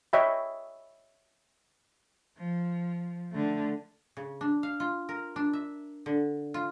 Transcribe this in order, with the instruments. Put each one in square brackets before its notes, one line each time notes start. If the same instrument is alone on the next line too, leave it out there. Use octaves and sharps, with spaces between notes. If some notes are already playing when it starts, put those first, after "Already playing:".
[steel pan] C#5 D#5 E5 G5 B5
[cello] F3
D3 A3
[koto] C#3
D4
F5
F4
A#4
D4
E5
D3
F4